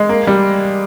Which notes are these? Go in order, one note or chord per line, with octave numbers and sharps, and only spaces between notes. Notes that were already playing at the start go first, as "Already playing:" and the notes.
Already playing: G#3
A#3
G3